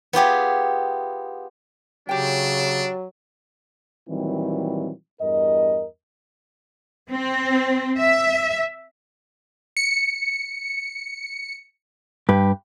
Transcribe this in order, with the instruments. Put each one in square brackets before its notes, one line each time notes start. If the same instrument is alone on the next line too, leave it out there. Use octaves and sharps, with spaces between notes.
[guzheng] B3 F4 G4 G#4
[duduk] C#3 [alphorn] F#3 [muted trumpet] D4 [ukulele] G4 G5
[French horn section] A#2 D#3 E3 F#3 G3 C4
E2 G2 A#4 D#5
[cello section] C4
E5
[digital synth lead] C#7
[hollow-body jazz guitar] G2 G4 B4